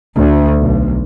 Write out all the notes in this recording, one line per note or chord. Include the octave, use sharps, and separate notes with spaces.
D2
B1